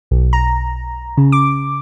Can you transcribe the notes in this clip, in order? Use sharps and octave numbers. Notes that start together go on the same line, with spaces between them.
B1
A#5
C#3
D6